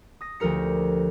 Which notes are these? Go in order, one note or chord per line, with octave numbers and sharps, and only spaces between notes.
D#6 A#6
D2 F3 G4 A#4 C#7